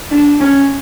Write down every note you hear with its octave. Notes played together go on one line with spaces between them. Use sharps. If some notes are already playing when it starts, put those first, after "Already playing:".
D4
C#4